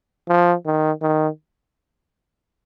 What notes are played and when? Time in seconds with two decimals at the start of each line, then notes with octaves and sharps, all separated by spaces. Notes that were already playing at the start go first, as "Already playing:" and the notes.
0.29 F3
0.66 D#3
1.02 D#3